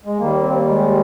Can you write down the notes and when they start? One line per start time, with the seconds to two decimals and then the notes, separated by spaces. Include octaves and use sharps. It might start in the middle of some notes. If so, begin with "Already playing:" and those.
0.05 G#3
0.19 D#2 D#3 G3 A#3
0.41 C4
0.54 A#3
0.68 G#3